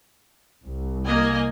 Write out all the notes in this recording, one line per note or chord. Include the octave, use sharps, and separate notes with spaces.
C2
A#3 D#5 G#5